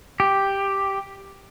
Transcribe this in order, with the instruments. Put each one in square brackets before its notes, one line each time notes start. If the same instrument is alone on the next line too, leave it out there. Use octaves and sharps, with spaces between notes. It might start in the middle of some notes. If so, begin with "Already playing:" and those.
[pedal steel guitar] G4